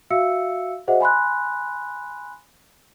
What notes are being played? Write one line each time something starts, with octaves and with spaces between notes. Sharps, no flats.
F#4 E5 F5 E6 C#7
F#4 G#4 C5 D#5 E5 F#5
G#5 B5 C6 F#6